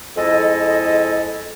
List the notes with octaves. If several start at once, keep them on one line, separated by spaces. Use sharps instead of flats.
F2 G#3 E4 A4 D#5